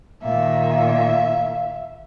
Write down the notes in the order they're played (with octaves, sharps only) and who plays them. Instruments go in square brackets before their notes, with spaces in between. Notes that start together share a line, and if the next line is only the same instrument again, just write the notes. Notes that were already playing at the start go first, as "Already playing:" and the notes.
[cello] A#2 D#3 [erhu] E5 [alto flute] F5